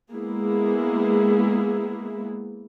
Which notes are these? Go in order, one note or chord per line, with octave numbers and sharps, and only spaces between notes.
G#3 A#3 B3 E4 G#4